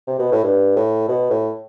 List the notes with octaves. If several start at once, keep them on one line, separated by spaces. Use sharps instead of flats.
C3
B2
A2
G2
A2
B2
A2